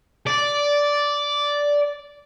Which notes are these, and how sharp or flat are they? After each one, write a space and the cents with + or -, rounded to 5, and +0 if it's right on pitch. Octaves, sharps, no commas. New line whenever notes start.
D5 -10